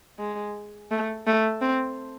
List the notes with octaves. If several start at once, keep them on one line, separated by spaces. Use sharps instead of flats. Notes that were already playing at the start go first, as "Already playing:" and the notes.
G#3
A3
A3
C4